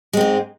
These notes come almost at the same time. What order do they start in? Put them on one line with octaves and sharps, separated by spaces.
G#3 C4 G#2